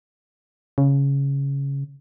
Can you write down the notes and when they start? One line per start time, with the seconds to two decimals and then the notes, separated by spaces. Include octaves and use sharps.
0.78 C#3